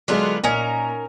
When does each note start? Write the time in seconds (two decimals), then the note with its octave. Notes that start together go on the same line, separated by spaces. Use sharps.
0.08 D3 F#3 G#3 B3 F4
0.44 A#2 C#4 D#4 A#4